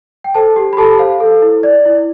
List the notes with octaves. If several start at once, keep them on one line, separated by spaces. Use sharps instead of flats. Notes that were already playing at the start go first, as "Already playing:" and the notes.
G5
A4 C5 A5
G4
B5
G4 A4 A5
C5 F5
A4
E4
D5
E4